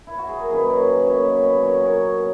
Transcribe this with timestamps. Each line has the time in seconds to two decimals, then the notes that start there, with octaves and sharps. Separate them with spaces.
0.07 E4
0.18 F#4
0.28 G#4
0.39 A#4
0.50 F#2 D#3 A#3 C#4 G#4 B4
0.61 B4
0.69 A#4 C#5
0.87 B4 D#5
1.06 B2 A#3 C#4 C#5 E5
1.24 C#5 E5
1.43 B4 D#5
1.62 A#2 F#3 C#4 C#5
1.75 D#5
1.86 A#4 C#5
2.18 C#4